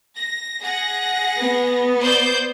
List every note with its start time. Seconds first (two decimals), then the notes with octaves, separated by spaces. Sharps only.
0.17 A#6
0.61 G#4 F#5 A#6
1.38 B3
1.99 C5 D5 G6